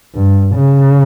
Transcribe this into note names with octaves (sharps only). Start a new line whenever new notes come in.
G2
C#3